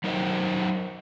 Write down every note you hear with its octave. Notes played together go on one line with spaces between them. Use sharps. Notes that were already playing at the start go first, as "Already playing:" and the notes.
F#3 D#4 A#4 C5 D#5